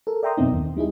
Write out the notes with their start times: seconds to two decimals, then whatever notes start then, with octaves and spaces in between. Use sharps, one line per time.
0.07 A4 A#4
0.23 D5 E5 G5 A#5 C6 D#6
0.37 F#2 B2 B3 C4 D#4
0.52 D#2
0.77 G3 D#4 E4 G#4